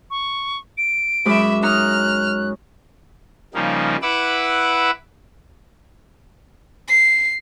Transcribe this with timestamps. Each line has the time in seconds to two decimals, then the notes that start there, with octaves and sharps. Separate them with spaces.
0.10 C#6
0.78 D7
1.25 F#2 G#3 E5 B5 D6
1.63 D#4 C#5 A#5 F6 F#6
3.54 C#3 F3 G3 A#3 D#4
4.02 E4 B4 F#5 D6 E6
6.88 C7